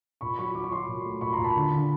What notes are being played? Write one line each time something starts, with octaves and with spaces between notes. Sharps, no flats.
A#2 B5 C#6
F#3 B5 C#6
F#3 D6
C#6
F#3 C6 D6
A#2
A3
A#2 B5 C#6
A#5 C6
A#2
A5 B5
D3
D3